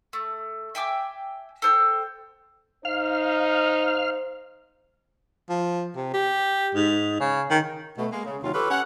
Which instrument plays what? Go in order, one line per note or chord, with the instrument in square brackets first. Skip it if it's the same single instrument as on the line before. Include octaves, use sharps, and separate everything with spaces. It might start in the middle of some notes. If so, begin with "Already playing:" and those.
[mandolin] A3
E5 G5 G#5 D6
A4 C5 G5
[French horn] D#4 [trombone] C5 [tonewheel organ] F5 F6
[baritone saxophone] F3
C3
G4
G#2
C#3
D#3
[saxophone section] B2 A3
G#3 A#3
C#3
D#2 C3 F#3 F4
F4 G4 A4 B4 C#5
C#4 F#5